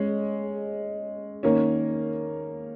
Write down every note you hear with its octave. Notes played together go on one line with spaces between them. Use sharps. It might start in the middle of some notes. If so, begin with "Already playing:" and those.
Already playing: G#3 C#4
D#3 A#3 C#4